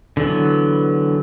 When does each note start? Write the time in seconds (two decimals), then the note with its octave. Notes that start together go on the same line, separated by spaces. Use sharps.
0.17 D3 E3 F#3 B3